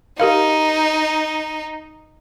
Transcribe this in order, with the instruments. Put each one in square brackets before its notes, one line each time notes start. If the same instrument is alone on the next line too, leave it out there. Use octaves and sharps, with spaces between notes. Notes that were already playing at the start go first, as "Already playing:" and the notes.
[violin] D#4 [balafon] G4 A#4 F5